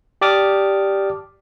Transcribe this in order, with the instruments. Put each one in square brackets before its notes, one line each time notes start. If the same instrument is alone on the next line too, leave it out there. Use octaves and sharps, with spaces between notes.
[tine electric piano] G4 D5 A5 D6 D#6 F6